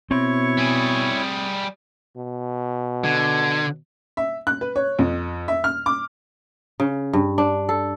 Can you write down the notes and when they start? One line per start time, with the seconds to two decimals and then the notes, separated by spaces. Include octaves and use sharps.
0.11 B2 C4 E4 C#5 C#6
0.57 G3 G#4
2.16 B2
3.04 D3 G#6
4.17 E5
4.47 F#6
4.61 B4
4.76 C#5
4.99 F2
5.48 E5
5.64 F6
5.86 D6
6.80 C#3
7.13 G2
7.38 D4
7.69 A4